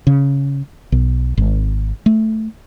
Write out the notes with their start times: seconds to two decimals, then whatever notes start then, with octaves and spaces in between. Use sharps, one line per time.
0.07 C#3
0.92 B1
1.37 G#1
2.06 A3